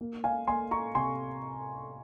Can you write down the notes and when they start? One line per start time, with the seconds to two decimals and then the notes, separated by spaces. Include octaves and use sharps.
0.01 A#3
0.24 F5 G#5
0.47 A#3 G#5 C6
0.71 A#5 C#6
0.95 C3 G#5 C6